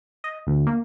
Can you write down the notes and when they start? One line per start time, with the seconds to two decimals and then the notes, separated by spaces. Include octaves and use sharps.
0.24 D#5
0.47 D2
0.67 A#3